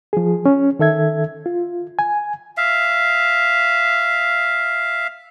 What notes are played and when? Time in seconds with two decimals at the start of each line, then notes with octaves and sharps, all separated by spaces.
0.13 F3 G#4
0.46 C#4
0.79 D#3 A4 E5 G#6
1.46 F4
1.99 G#5
2.57 E5 F5